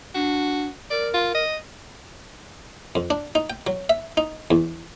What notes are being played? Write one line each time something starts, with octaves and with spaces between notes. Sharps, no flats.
D4 F#4
A#4 D5
F4
D#5
F2
D4
D#4
G5
F#3
E5
D#4
E2